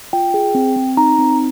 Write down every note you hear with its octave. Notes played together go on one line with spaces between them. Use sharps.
F4 G5
G#4
C4
C4
D#4 A#5
C4